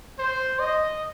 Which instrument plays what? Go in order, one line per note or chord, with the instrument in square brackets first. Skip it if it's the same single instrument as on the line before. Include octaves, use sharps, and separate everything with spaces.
[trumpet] C5
D#5